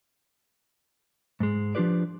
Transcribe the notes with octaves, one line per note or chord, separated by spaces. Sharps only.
G#2 G#3
F3 D4 F4 G4 B4 D5